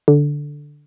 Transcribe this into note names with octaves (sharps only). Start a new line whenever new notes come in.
D3